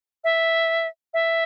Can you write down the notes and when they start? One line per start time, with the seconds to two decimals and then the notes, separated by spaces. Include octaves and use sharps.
0.24 E5
1.14 E5